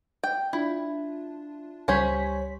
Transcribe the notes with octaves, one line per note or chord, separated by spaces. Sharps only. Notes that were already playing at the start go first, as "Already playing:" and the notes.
G5
D4 E4 F4
C#2 G3 C#4 C5 C#5 B6